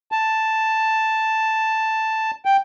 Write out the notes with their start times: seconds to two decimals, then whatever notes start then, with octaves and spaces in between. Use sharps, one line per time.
0.12 A5
2.45 G5